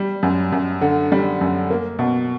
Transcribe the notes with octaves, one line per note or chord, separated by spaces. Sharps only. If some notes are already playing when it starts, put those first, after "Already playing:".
Already playing: G3
F#2
F#2
D3
G3
F#2
A#3
B2